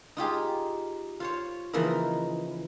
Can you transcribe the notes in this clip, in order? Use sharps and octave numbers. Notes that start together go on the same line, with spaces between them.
D#4 F4 G4 G#4
F4 C5 C#5
C#3 E3 F3 A#3 D#4 A#4